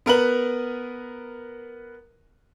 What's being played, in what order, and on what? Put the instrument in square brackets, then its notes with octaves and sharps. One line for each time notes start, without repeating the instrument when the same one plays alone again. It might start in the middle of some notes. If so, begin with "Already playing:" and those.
[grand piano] B3 A#4 B4 F#7